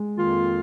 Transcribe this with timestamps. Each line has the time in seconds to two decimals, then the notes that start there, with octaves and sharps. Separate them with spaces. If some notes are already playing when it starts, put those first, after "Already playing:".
Already playing: G#3
0.16 F2 D#3 A#3 F4